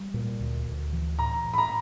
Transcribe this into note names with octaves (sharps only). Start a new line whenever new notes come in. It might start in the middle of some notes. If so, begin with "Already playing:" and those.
Already playing: G3
A#2
D2
D2
E3
A2 A#5
A2
B5
A#5